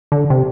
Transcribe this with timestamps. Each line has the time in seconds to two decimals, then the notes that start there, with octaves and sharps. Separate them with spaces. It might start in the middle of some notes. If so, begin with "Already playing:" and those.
0.12 D3
0.30 C3